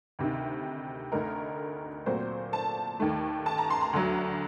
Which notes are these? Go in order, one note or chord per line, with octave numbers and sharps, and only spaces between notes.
D2 C3 D#3
D2 D3 A3 D#4 A#4
A#2 F#3 A3 C4 C5
A5
D#2 D#3 A3
A5
A#5
C6
A#5
D2 D3 F#3